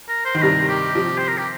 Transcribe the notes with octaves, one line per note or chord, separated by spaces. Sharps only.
A#4
C5
D#3
C5
G2 C3 A#4
G4
C3 F3
C5
A#4
G4